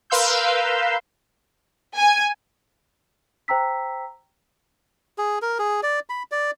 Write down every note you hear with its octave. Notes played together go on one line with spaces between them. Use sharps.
A#4 B4 F5 C6 E6 G6
G#5
C5 G5 A#5 E6 B6
G#4
A#4
G#4
D5
B5
D5